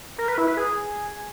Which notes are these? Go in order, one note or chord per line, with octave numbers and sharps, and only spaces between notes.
A#4
B4
E4
B4
G#4